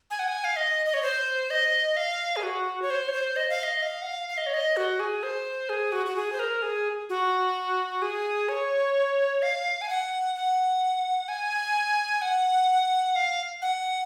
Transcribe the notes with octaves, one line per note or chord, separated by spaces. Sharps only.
G#5
F#5
G#5
F5
D#5
D#5
C#5
C5
D#5
F5
G#4
F#4
C#5
C5
C#5
C5
D#5
F5
D#5
F5
F#5
F5
F5
D#5
C#5
D#5
F#4
G#4
C5
G#4
F#4
F#4
G#4
C5
A#4
G#4
F#4
G#4
C#5
F5
G#5
F#5
F#5
G#5
F#5
F5
F#5